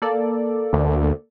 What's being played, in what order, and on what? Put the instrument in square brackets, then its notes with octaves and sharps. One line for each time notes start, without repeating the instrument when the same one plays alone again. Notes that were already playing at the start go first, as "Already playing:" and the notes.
[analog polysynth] A#3 A4 D5
[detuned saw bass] D2